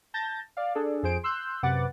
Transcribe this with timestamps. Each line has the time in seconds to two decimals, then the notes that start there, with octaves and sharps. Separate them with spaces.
0.14 A5 G6 A6 A#6
0.57 D5 F5
0.75 D4 G#4 A4 D5
1.03 F2 G#4 C5 D7
1.23 C6 E6 F#6 G6
1.63 F#2 C3 B4 F#5 D6 A6